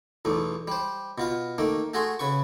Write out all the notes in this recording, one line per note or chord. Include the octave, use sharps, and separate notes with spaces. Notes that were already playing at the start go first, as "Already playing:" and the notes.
B1 E2 A3
G3 C5
B2 F4 F5
D#3 A3 A#3
A3 F#4 G#4 C6
C#3 B4 C#6